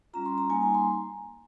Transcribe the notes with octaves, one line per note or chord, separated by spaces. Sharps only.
G3 C#4 F4 A#5
C6
A#5
G3 A#3 D#4 G#5
A#5
C6